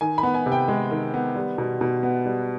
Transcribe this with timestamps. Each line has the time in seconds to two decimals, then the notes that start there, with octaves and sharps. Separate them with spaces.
0.01 D#3 G#5
0.18 B5
0.23 B3
0.34 G#5
0.46 C3
0.52 G5
0.68 G#3
0.91 D#3
1.14 B3
1.36 G3
1.58 B2
1.81 B2
2.03 B3
2.25 G3